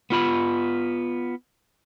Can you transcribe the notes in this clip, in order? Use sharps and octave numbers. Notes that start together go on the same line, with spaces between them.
B3 F4 B5